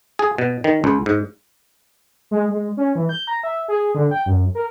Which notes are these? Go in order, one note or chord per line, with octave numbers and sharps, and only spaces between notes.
G#4
B2
D#3
C#2
G#2
G#3
G#3
C#4
E3
G6
A#5
E5
G#4
D3
G5
F#2
A#4